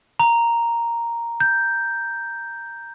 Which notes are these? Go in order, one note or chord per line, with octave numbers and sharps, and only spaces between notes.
A#5
G6